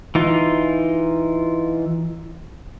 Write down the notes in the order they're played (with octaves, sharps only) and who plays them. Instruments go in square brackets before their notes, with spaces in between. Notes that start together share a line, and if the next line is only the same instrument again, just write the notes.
[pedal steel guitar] E3 D#4 F4